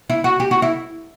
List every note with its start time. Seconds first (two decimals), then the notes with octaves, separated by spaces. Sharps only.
0.10 E4
0.24 F#4
0.40 G4
0.51 F#4
0.62 E4